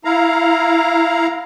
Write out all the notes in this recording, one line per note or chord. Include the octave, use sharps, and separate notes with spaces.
E4 F5 A#5